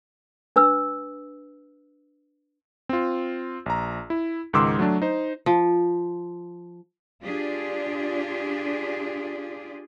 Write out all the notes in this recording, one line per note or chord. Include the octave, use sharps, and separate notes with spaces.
D4 B4 E6
C4 F4
A#1 A#5
E4
C#2 G#2 D#3 C6 D6 E6
F#3 A3 D4
D#4 C5
F3
D4 F4 G4 G#4 D5